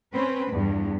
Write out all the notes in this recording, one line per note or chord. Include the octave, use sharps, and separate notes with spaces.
C4 C#4 B4
E2 G2